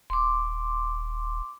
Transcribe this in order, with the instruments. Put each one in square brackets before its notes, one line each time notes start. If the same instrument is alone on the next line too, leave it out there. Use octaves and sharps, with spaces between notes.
[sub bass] D#1 [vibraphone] C6 D6